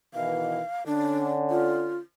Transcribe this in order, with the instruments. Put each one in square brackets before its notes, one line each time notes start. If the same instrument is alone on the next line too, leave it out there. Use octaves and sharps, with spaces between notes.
[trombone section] B2 D#3 E3 [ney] F5
[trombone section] D3 C#4 [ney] D4
[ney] F4